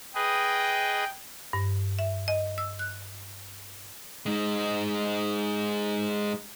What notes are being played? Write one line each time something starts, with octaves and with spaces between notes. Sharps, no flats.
G#4 B4 D#5 G5
G2
E5
D#5
E6
F#6
G#3 D#4